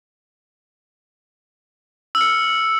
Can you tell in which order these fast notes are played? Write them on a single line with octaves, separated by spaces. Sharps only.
E6 F6 C#7